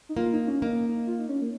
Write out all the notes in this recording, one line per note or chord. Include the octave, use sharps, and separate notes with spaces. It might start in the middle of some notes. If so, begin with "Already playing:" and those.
D#4
A#3 F4
D#4
C#4
A#3 D#4
F4
D#4
C#4
A#3